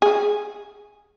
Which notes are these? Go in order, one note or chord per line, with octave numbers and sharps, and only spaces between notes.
G#4